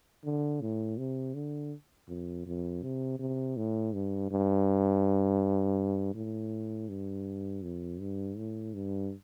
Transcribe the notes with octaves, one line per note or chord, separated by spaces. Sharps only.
D3
A2
C3
D3
F2
F2
C3
C3
A2
G2
G2
A2
G2
F2
G2
A2
G2